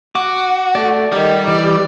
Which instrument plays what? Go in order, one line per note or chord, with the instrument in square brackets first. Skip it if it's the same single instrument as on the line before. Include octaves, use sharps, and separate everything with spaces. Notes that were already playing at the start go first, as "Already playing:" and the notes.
[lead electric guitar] F#4 [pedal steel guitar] D6
[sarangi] A3 [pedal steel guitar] D5
[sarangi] D#3 [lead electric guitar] G3
[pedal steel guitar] E3 [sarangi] D5